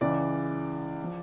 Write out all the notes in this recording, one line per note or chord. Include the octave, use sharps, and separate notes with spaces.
C#2 C#3 E3 D5
F3